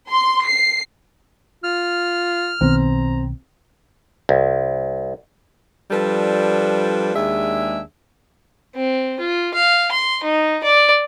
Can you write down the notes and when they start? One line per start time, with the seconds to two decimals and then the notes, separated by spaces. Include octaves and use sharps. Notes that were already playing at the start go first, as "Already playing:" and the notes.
0.10 C6
0.47 C7
1.64 F4 F6
2.61 B1 D#3 B3 C4 A#5
4.29 C2
5.91 F3 G3 D4 A4 B4
7.14 D#2 G#3 D4 G#4 E5
8.75 C4
9.20 F4
9.54 F5
9.91 C6
10.23 D#4
10.63 D5